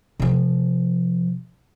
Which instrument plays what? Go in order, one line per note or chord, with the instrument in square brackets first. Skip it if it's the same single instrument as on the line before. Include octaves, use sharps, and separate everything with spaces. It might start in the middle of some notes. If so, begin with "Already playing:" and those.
[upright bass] C3 F3